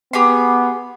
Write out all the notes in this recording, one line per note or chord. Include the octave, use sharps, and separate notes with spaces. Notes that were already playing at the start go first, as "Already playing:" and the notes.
B3 G4 G#4 C6